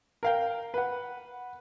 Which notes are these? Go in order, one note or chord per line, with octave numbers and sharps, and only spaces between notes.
A#4 F5 G5
B4 F#5